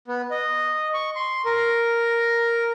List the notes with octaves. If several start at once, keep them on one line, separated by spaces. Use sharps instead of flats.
B3
D#5
C#6
C6
A#4